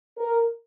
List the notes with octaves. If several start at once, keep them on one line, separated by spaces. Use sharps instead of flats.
A#4